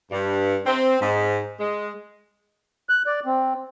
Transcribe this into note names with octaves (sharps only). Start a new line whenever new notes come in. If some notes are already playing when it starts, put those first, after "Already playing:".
G2
C4
G#2
G#3
F#6
D5
C4